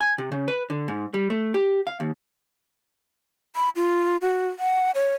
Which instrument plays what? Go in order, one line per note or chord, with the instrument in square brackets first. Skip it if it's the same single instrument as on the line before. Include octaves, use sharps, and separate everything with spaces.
[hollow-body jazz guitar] G#5
C3
C#3
B4
D3
G#2
G3
A3
G4
F5
D#2
[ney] B5
F4
F#4
F#5
C#5